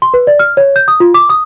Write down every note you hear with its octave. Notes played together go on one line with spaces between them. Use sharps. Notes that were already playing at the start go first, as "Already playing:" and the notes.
C6
B4
D5
F6
C#5
G6
D#6
F4
D6
D#6